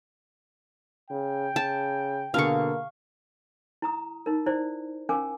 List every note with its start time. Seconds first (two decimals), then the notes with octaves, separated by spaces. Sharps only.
1.10 C#3 G5
1.56 C#3 A5
2.34 B2 D3 A#3 G#4 F5 C#6
3.82 E4 A#5 D#6
4.26 D#4 A#4
4.46 E4 C5 D5
5.09 C#4 A#4 F5 G#5 D6